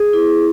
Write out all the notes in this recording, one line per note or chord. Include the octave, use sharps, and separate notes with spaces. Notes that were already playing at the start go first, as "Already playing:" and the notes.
Already playing: G#4
E4